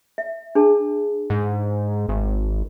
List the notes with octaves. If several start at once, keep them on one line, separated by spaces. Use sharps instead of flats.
E5
D4 G#4 A5
G#2
G#1